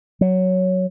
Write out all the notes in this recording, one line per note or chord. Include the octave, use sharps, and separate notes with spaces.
F#3